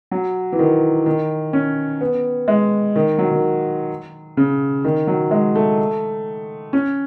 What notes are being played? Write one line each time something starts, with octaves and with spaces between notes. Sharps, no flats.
F#3
E3
D#3
D#3
C#4
B3
G#3
D#3
F#3
D#3
C#3
D#3
F#3
G#3
A3
C#4